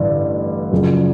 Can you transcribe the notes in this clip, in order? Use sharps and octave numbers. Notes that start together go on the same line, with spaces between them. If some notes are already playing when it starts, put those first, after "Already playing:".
Already playing: A1 G2 D3
F#2 C#3 F3